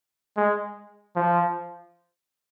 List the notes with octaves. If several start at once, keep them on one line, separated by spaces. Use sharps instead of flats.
G#3
F3